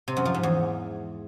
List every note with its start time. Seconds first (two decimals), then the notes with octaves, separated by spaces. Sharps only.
0.08 C3
0.17 F#2
0.25 F3
0.34 G#2
0.43 E2